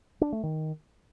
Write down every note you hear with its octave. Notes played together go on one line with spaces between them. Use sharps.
D4
A3
D#3